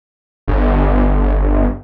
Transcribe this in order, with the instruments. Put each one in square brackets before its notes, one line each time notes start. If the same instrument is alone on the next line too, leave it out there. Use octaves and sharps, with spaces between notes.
[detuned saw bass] G1